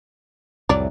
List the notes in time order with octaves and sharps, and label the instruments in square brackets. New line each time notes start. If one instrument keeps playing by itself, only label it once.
[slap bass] C2 F2 A2 [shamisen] F#3 D5